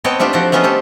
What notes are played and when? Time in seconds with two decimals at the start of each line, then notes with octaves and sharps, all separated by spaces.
0.04 B3 C4 C#5 D#5 G5 A5
0.19 A3 C4 D4 F4 G4
0.33 F3 C4 F#4 D5 F#5
0.52 A3 B3 C#4 F4 D#5
0.64 C4 G4 A4